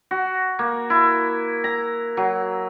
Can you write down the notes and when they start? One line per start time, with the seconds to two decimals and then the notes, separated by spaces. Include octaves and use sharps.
0.11 F#4
0.59 A#3
0.90 E4
1.64 A#5
2.17 F#3